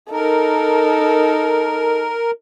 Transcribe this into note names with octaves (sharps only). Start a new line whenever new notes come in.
D#4 A4 A#4